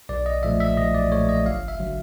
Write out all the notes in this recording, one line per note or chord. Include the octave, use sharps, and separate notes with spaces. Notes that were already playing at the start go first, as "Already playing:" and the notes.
B1 D5
D#5
A#2 F3 A3 E5
E5
B1 D#5
D5
A#2 F3 A3 C#5
D#5
G1 F5
E5
D3 F#3